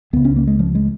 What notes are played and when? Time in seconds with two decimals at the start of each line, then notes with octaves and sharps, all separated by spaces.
0.13 C#2 C#3 B3
0.25 C#4
0.36 A#3
0.47 G#3
0.59 F3
0.75 G#3